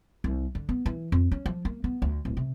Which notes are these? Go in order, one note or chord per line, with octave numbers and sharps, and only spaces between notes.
C2
D3
B3
E3
F2
C#4
F3
A#3
B3
D2
D1
C3